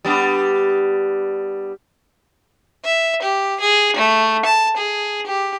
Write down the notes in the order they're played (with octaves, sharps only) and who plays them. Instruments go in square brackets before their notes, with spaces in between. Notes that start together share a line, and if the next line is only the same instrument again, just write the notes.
[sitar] G3 B3 D4
[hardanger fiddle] E5
G4
G#4
A3
A5
G#4
G4